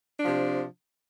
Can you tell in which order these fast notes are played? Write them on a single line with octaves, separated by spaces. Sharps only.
D4 F3 C3